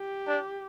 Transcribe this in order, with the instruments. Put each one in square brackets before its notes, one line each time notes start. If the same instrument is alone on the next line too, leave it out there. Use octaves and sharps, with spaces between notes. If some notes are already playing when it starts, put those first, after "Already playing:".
Already playing: [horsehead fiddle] G4
[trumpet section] D4